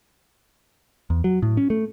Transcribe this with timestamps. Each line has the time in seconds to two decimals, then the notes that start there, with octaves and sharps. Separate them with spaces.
1.10 E2
1.24 F#3
1.42 A2
1.57 C#4
1.70 A3